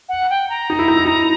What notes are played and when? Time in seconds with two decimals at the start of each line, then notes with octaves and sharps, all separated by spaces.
0.09 F#5
0.30 G5
0.50 A#5
0.70 D#4
0.79 E4
0.88 D#4
0.97 E4
1.05 D#4